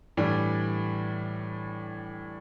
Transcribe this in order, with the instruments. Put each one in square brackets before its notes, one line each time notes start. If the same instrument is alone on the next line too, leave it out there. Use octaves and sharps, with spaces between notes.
[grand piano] A2 E3 G3 D4